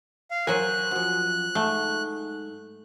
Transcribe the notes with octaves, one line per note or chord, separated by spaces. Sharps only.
F5
F#3 A#4 C5 G#5 F#6
F#2 F3
G#2 A3